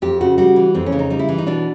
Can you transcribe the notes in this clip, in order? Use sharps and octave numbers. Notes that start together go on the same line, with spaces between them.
F2 G4
C#3 F#4
G3 F#4
E3
F2 C4
C#4
C#3
D#4
G3 D#4
E4
E3
D#4
B2 D4